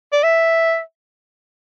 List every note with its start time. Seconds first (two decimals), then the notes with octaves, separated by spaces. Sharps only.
0.13 D5
0.23 E5